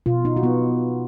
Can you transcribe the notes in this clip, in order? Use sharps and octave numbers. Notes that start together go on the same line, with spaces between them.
B2 F4
D#4
F#4
B3 F4